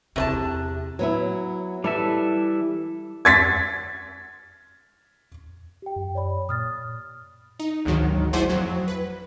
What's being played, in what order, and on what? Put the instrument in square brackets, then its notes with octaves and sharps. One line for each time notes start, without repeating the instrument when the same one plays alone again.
[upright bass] E2 C4 [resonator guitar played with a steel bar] C3 C5 A5
[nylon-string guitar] F#3 B3 E4
[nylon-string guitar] E3 [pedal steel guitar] G3 A4 E5
[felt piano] G#6 A6 B6
[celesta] G4 G5
[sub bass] F#2
[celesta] C#5 D5 B5
[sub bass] A#2 [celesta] D#6 F6 A6
[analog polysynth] D#4
G#1 D2 G#2 D#3 F#3
A3 E4 F#4 G#4 C5 D5
F2 F#3
B4